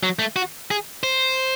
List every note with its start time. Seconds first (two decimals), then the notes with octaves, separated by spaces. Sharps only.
0.03 F#3
0.19 A3
0.36 F#4
0.71 G#4
1.03 C5